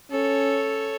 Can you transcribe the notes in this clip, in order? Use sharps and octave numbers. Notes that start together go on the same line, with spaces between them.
C#4 A4 C#5